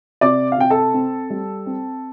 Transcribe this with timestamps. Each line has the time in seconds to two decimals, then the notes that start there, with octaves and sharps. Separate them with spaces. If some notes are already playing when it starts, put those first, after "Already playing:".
0.21 C3 D5 D6
0.52 F5
0.58 C3 G5
0.70 A4 A5
0.94 C4
1.30 G3
1.66 C4